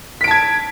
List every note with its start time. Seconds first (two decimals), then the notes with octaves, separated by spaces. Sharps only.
0.21 B6
0.24 D7
0.28 A5
0.31 G#6